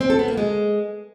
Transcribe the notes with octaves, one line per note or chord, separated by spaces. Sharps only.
C4
A4
B3
A#3
G#3